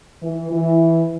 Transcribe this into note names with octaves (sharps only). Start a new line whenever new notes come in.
E3
E3